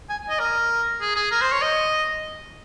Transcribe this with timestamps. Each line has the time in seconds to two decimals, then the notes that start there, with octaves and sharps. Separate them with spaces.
0.09 G#5
0.29 D#5
0.39 A#4
1.01 G#4
1.16 G#4
1.31 A#4
1.41 C5
1.52 C#5
1.62 D#5